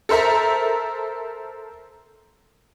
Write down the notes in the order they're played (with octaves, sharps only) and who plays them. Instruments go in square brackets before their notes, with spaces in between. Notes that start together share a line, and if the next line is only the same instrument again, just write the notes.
[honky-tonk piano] A4 A#4 C5 E5 A#5